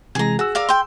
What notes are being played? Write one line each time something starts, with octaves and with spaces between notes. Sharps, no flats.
C3 E3 G#3 G#4 A#5
F#4 G#4 E6
A#4 D5 F5
G5 C6